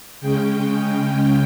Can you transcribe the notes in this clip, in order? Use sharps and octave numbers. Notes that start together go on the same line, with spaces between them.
C#3 G#3 C#4 G5